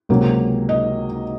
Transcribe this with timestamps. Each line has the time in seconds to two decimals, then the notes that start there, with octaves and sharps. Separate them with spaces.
0.09 C#2 C3 F#3 A#3
0.69 D#5